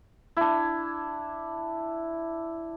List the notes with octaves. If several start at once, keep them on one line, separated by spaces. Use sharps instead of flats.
D4 E4